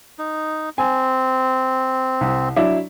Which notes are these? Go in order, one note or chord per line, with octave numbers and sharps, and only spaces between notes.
D#4
C4 G#5
C2
F#3 D4 E4